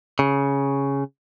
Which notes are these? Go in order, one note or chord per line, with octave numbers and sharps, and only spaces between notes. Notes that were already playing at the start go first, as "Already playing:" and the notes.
C#3